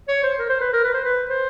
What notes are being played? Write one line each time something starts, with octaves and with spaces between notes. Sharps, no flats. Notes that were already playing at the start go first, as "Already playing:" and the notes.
C#5
C5
A#4
C5
B4
A#4
B4
C5
B4
C5